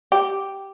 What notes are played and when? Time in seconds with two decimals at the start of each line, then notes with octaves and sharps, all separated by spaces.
0.12 G4